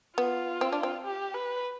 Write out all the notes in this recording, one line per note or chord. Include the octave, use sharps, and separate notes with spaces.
B3 F4
C4
D4
C4
G4
B4